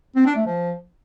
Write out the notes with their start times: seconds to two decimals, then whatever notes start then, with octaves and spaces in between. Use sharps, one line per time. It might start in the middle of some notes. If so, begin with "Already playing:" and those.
0.16 C4
0.26 D4
0.36 A3
0.46 F3